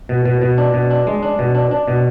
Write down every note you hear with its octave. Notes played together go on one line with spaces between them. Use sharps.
B2
B2
B2
D4
B2
D4
G#3
D4
B2
D4
D4
B2